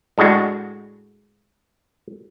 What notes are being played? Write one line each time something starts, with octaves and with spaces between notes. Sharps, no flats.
A2 G#3 D4 F#4